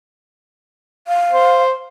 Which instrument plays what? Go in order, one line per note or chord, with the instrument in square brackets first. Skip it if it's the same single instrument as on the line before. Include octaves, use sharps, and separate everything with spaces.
[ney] F5
[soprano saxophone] C5